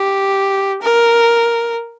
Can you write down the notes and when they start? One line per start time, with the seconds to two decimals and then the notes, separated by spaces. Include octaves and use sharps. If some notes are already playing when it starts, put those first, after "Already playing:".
Already playing: G4
0.82 A#4